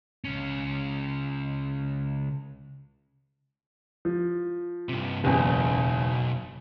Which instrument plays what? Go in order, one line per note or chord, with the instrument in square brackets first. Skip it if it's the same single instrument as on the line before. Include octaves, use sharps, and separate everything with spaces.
[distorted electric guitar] C#2 C#4
[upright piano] F3
[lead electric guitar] G2 C3
[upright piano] F#1 E2 [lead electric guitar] B1